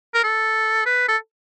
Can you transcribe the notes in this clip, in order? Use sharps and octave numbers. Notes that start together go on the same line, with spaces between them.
A#4
A4
B4
A4